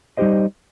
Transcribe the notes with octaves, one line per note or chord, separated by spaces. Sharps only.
G3 D#4 G4 C5 D#5